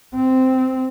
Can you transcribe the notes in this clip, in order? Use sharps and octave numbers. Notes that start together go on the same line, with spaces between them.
C4